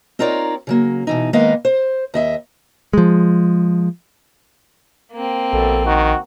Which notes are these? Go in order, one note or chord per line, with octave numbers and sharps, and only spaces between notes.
C4 D#4 F4 A#4 C#5 D5
C#3 F#3 A#3
B2 E3 D#4
D#3 G#3 A#3 B3 D#5 F5
C5
D#2 D#5 E5
F3 G#3
A#3 C4
A#1 B2 A4
D#3 F#4